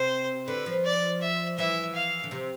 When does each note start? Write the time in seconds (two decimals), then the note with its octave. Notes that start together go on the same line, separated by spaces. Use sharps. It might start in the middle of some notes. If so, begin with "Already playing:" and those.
Already playing: C3 C5
0.48 D3 B4
0.66 F3
0.85 D5
1.22 E5
1.58 E3 E5
1.95 F5
2.24 D3
2.31 C3